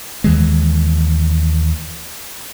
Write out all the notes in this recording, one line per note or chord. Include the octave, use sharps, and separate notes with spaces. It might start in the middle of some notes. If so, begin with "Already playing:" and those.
D#2 E3 G#3